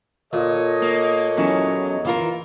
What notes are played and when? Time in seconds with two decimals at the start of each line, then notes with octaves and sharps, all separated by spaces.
0.33 A#2 A4 C#5 D#5
0.82 A#3
1.37 E2 F#3 C#4 E4
2.05 E3 F4 A#4